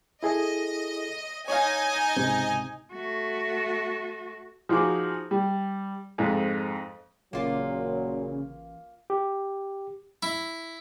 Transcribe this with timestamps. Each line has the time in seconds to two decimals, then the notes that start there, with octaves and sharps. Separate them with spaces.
0.23 E4 G#4 A4 D#5
1.48 D#4 C#5 D#5 F5 G#5
2.16 C#2 G#2 C3
2.92 A3 F#4
4.69 F3 D#4 F#4 G#4 D6
5.31 G3
6.18 F2 G#2
7.33 A1 A#2 C#3 F#3 A#3 F4
9.10 G4
10.23 E4